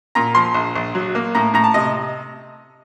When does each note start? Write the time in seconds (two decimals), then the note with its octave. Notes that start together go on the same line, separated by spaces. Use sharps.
0.15 A#2 A#5
0.35 F3 C6
0.54 A#1
0.76 A#1
0.95 F#3
1.15 A#3
1.35 A2 A#5
1.54 A2 A#5
1.64 A5
1.74 C3 D#5